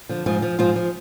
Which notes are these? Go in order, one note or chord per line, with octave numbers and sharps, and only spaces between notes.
D3 F3
G#2 F3 F4
F3
G#2 F3 F4
F3